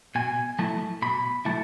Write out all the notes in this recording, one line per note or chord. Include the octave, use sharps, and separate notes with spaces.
B2 G#5
F#3 A3 E4 A5
B2 B5
F#3 A3 E4 A5